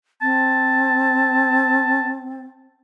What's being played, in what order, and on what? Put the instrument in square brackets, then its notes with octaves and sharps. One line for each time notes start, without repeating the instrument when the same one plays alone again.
[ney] C4 [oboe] A5